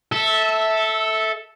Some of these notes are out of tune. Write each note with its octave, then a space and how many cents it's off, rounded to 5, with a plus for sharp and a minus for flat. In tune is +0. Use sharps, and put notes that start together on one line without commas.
A4 +0 E5 -15